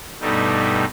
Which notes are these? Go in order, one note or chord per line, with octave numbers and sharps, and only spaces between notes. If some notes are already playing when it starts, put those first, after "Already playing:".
G2 B2 G3 A3 D#4